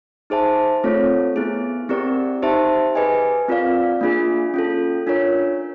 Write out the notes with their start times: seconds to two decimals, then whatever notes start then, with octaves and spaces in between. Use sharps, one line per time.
0.30 D#4 G#4 C5 E5 A5
0.84 A3 C4 F4 A4 C#5
1.36 B3 E4 G#4
1.89 C4 E4 G4 A#4 D5
2.42 D#4 G4 C5 E5 A5
2.95 G#4 B4 D#5 G#5
3.48 C4 F4 A#4 D5 F5
4.01 A#3 D4 F4 G#4
4.54 C#4 F4 A4
5.07 D4 F4 A#4 C#5